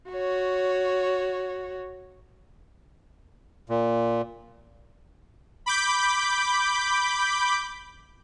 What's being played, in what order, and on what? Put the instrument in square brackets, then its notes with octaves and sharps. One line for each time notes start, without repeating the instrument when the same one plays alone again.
[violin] F#4 C#5
[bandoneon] A#2
[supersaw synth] B5 D6 G6